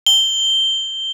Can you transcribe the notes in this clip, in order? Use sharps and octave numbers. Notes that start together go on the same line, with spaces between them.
G7